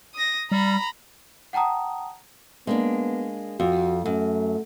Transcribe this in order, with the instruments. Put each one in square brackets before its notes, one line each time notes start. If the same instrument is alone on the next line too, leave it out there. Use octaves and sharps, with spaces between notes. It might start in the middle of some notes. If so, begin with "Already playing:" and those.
[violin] D#6 A#6
[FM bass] G3 [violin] A#5 B5
[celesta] F#5 G5 A5 A#5 D#6
[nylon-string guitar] G#3 A#3 D4 [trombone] B3
[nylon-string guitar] F2 [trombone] F#4
[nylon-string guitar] F#2 [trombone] A3